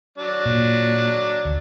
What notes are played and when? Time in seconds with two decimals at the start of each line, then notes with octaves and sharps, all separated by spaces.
0.18 F#3 D4
0.46 A#2
1.45 D2